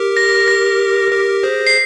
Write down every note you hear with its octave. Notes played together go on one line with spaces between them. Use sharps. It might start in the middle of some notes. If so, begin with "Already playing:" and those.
Already playing: G4 A#4
A#6
A#6
G4 A#4
G#4 C5
C7